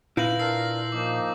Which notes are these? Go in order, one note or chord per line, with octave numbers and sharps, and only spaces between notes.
A#2 E4 B4 F5 G6 A#6 F#7
D4 F4 A#4 E6 A#6 C7
F3 A#3 D#4 D6